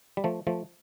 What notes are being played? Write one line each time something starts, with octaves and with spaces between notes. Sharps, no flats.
G3
F3 A3
F3 A3